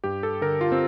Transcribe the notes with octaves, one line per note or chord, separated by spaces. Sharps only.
G2 G4
A4
D3 A#4
F4
C4